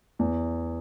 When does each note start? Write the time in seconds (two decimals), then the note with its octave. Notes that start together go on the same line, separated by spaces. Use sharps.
0.19 E2